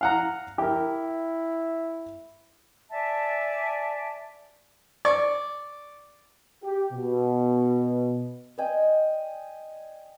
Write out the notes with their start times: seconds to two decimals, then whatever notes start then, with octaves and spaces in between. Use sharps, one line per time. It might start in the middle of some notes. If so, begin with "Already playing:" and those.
0.01 F5 F#5 A#5
0.58 E4 G4 A#4
2.91 D5 E5 G#5 A5
5.05 D5 C#6
6.64 G4
6.93 B2
8.58 D5 D#5 G5 G#5